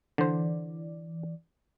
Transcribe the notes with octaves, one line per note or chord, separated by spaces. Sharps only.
D3 E3 C5 D5